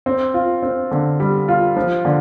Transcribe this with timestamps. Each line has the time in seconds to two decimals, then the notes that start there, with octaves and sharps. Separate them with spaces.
0.06 C4
0.34 F4
0.63 C4
0.91 D3
1.20 G3
1.48 F4
1.76 F3
2.05 D3